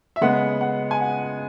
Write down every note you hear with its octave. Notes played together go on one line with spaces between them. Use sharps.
E5
C#3 G#3 B3 F#5
F#5
G#5
F#5